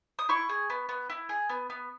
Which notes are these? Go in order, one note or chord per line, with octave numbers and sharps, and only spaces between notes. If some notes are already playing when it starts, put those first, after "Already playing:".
D#6
E4 C#6
G#4
B3
B3
E4
G#4
B3
B3